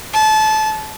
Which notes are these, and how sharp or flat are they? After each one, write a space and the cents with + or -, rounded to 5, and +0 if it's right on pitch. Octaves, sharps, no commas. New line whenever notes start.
A5 -25